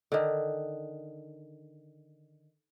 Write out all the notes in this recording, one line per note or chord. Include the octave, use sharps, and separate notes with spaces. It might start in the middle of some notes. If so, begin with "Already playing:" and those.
D3 D#3